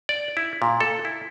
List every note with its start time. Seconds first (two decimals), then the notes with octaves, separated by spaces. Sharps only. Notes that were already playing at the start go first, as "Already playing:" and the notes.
0.09 D5
0.37 E4
0.62 A#2
0.80 A4
1.05 E4